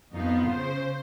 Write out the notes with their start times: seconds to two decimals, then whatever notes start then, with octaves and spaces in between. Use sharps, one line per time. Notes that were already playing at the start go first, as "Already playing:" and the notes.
0.14 F2 B3 D#4 F4
0.49 C#3 C5